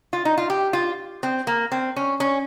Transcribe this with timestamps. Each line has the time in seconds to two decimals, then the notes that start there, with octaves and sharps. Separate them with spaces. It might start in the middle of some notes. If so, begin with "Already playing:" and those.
0.13 F4
0.25 D#4
0.38 F4
0.50 G4
0.73 F4
1.23 C4
1.47 A#3
1.72 C4
1.96 C#4
2.20 C#4